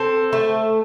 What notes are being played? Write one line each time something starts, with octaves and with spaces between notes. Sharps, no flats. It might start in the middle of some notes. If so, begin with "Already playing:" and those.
Already playing: C4 A4
A3